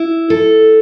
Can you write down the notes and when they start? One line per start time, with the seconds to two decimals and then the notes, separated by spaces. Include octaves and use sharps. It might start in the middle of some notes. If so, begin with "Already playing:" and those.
Already playing: E4
0.30 A4